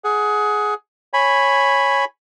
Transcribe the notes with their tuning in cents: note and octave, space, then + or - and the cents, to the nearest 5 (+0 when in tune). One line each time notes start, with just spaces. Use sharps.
G#4 +15 F#5 +0
C#5 -10 G#5 +0 B5 +0